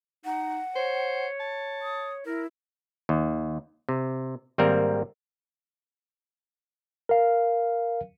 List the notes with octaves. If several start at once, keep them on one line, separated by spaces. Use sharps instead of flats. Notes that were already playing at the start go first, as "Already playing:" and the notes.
D#4 F#5
C5 C#5
A5
D#6
E4 A#4
D#2
C3
G#1 G3 A#3 C4 A#4
A#4 F5